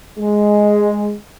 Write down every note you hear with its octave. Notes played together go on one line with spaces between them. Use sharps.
G#3